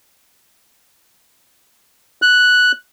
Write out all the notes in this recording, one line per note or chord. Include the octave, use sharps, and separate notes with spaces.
F#6